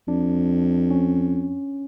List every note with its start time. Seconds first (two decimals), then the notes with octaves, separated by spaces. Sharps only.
0.08 F2 D4
0.91 C#4